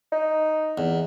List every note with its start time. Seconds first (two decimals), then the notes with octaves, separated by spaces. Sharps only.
0.12 D#4
0.78 E2